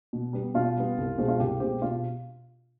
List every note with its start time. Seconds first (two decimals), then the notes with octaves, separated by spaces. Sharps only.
0.13 B2
0.33 G3 B3
0.54 B2 F4
0.77 G3 B3
0.98 C2
1.18 B2 G#3 C4
1.28 F4
1.40 C2 G4
1.60 B2 G#3 C4 G4
1.82 B2 F4